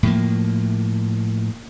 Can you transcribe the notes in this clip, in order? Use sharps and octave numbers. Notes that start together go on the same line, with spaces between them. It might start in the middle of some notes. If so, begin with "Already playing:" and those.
A2 F3 A#3